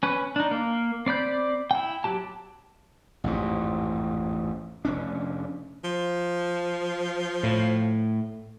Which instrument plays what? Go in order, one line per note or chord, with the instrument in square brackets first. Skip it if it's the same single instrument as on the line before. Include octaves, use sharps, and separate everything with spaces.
[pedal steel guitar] C#4 B4
D4 D#4
A#3
C4 D5 B5 G6
E4 G5
F#3 G4 A5
[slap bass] A1 F2 G#2
F1 C#4 D4
[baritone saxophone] F3
[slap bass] A2